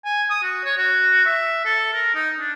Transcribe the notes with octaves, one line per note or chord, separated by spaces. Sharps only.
G#5
D#6
F#4
C#5
F#4
E5
A4
A#4
D#4
D4